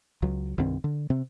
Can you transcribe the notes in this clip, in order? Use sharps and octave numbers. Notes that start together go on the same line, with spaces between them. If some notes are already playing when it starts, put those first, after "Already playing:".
C#2 F#3
C2 G2 D#3 C4
D3
C3 C4